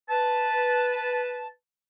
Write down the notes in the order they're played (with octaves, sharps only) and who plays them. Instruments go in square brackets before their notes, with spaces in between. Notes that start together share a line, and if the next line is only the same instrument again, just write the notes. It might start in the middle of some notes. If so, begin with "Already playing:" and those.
[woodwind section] B4 A5